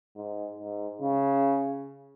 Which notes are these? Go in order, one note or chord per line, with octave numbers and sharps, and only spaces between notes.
G#2
G#2
C#3